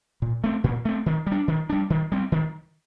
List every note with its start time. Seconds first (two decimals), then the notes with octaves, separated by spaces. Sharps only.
0.22 A#2
0.44 A3 C4
0.64 A#2
0.85 A3 C4
1.06 D#3
1.27 G3
1.32 D4
1.48 D#3
1.70 G3 D4
1.90 D#3
2.12 G3 C4
2.32 D#3